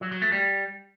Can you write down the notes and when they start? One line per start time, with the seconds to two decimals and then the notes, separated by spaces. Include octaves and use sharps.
0.01 F#3
0.11 F#3
0.22 A3
0.32 G3